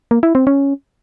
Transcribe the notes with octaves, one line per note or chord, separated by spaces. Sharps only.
A#3
E4
C4
C#4